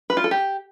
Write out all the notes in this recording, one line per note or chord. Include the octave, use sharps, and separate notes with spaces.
B4
F4
A4
G4